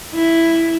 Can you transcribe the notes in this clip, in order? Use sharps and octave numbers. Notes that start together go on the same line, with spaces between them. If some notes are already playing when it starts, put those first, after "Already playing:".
E4